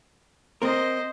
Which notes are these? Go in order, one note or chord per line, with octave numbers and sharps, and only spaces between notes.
C4 A#4 C5 D#5